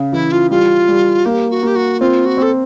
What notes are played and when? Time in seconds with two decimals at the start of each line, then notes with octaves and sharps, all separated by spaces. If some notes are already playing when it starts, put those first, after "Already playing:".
Already playing: C#3
0.13 E3 E4
0.32 F4
0.51 G3 F4
0.88 G3
1.25 A#3 G4
1.50 F#4
1.63 A#3 G4
1.76 F#4
2.00 C4 F4
2.25 F#4
2.38 C4 A4